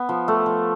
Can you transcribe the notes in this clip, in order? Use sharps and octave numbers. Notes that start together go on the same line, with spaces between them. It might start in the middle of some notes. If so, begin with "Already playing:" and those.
Already playing: B3
F3
A3
F3